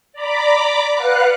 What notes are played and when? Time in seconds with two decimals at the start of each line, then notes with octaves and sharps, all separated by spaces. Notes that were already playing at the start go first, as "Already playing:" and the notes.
0.13 D5 A#5 B5 D6
0.95 B4 F5 F#5 F#6